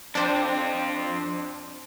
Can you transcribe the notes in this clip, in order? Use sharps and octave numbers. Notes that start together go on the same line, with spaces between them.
F2 C4 D4 C5